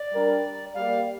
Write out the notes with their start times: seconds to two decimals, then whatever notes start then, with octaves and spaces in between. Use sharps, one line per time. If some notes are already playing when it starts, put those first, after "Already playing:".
Already playing: D5
0.13 G3 D4 A#4
0.74 G3 A#3 G4 D5 F5